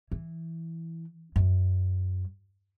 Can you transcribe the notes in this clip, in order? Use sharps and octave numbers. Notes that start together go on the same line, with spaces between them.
E3
F#2